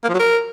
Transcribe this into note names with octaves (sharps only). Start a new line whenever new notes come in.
A#3
F3
F#3
A#4